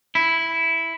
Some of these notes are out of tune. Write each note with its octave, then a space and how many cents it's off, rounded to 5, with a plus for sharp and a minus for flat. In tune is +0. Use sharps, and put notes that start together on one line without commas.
E4 +0